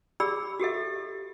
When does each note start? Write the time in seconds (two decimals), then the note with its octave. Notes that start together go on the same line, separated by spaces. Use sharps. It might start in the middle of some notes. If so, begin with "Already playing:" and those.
0.20 G4 G#4 D5 B5 E6
0.60 F#4 G4 A4 E5